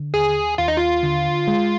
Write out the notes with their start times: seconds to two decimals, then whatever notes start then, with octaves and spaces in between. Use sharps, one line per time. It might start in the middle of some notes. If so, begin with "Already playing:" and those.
Already playing: D3
0.14 D#2 G#4
0.58 D#2 F4
0.68 D#4
0.76 F4
1.03 D3
1.48 G#3